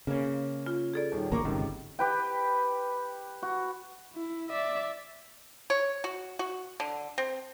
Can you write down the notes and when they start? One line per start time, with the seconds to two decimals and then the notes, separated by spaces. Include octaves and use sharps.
0.07 C#3 A#3 C#4
0.66 F4
0.94 G#4 A4 D5
1.12 D#1 D#3
1.32 A1 D2 A#3 A#5 C#6 D6
1.45 G1 C#2 C3 D#3
1.99 G4 B4 G5
3.43 F#4
4.14 E4
4.49 D5 E5
5.70 C#5
6.04 F#4
6.39 F#4
6.80 D3
7.18 C4